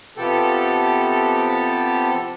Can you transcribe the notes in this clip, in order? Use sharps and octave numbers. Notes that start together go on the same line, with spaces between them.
C3 F3 B3 G4 A4